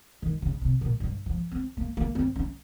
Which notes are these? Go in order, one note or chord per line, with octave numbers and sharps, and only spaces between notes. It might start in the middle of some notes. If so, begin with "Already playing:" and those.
D#3
C#3
C3
A#2
G2
F3
C4
A#3
A#3
C4
C#4